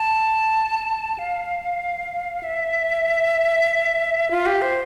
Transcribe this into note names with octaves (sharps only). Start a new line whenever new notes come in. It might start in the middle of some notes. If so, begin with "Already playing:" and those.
Already playing: A5
F5
E5
F4
G4
C5